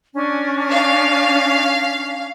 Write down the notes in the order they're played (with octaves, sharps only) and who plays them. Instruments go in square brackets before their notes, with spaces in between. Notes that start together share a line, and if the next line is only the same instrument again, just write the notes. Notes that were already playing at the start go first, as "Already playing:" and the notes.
[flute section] C#4 D4
[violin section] F5